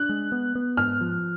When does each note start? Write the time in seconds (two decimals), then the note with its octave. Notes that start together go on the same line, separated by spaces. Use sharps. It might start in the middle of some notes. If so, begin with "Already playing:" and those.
Already playing: D4 F#6
0.09 G#3
0.32 B3
0.55 B3
0.77 G#2 F6
1.01 F3